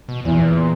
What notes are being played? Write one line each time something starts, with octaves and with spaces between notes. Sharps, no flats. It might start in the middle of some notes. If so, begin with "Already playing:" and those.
B2
E2 A#2